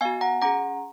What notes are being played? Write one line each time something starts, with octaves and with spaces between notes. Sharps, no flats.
B3 F#4 F5 G#5
F#5 A#5
C#4 G#4 F#5 A#5